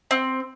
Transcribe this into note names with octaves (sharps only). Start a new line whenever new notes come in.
C4